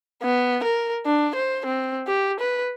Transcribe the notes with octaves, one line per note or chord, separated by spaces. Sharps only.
B3
A#4
D4
C5
C4
G4
B4